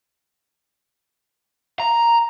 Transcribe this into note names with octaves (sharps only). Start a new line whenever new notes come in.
A#5